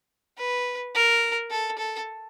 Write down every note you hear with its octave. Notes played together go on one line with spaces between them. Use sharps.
B4
A#4
A4
A4